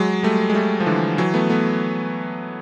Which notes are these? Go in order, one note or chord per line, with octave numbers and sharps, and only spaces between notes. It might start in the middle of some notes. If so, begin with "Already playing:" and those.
Already playing: F#3 G#3
G3 A3
G#3
G3 A3
F3
D3 E3
E3 F#3
A3 B3
A3 B3